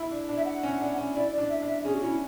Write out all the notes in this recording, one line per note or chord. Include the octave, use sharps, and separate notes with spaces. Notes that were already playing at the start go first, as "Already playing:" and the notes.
Already playing: E4
D4
D4
E5
F#5
C#4
D4
C#4
E4 D5
D5
D4
E5
D4
E5
C#4 G#4
F#4
C#4 E4